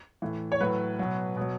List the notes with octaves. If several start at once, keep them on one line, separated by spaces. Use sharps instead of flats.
A2 E3
C#5
A2 F#3 B4
B2 F#3
B2 F#3